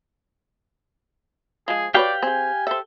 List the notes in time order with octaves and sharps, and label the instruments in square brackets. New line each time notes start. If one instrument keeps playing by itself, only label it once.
[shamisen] F3 G#3 [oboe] G#4
[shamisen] F#4 B4 C#5 [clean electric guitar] G4 F5 G5 [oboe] D5
[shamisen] C4 G#4 [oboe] G#5
[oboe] A4 [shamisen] C5 E5